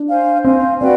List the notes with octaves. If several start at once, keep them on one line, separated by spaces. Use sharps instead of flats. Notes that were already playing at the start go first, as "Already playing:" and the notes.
Already playing: D4
C5 F5 G#5
C4 C5 F5 G#5
C4 F#4 B4 D5 G5